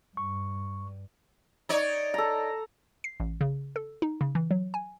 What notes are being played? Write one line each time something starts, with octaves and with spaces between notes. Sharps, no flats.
G2 C#6
D#4 C#5 D5
A4 A#5
C7
A1
C#3
A4
D#4
C#3
E3
F#3
G#5